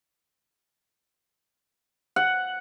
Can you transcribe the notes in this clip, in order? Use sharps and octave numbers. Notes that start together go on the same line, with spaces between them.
F#5